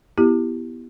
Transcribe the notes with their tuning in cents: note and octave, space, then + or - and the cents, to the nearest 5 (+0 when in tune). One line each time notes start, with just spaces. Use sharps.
B3 +0 E4 +10 G4 +0